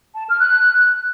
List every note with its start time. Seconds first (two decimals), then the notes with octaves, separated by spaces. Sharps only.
0.16 A5
0.28 F6
0.40 F#6